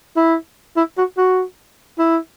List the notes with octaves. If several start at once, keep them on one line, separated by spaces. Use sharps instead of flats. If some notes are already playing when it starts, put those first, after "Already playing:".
E4
E4
F#4
F#4
E4